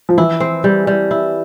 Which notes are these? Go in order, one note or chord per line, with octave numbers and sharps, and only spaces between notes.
F3
E3 E4
C4
G3
G3
E4